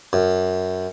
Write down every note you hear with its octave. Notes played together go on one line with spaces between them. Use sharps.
F#2